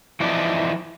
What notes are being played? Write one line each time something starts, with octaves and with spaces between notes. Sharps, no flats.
E3 F3 D#4 D5